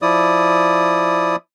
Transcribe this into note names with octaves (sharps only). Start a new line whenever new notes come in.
F3 E4 D5 D#6